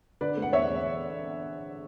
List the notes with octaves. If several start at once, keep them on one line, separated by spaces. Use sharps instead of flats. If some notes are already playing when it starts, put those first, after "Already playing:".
D3 B4 D5
A3
F#5
E2 C#5 E5
E2